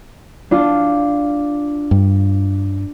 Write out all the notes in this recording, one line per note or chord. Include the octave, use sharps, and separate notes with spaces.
D4 F4
G2